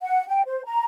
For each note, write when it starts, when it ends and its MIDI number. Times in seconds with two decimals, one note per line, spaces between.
0.02 0.26 78
0.28 0.42 79
0.46 0.64 72
0.65 0.85 82